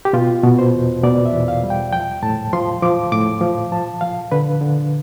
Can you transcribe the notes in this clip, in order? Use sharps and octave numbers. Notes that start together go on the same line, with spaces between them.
G4
B2 F4
B2
C5
E2
B2 D5
E5
E2
F5
G3
G5
F3 G5
A2 A5
F3 C6
F3 D6
A2 D6
F3
F3 A5
F3 F5
D3 B4
D3